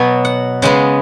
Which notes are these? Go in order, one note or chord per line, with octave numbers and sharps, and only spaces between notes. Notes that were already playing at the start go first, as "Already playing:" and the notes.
Already playing: B2 F#3 B3 G#5
F#5
C#3 G#3 B3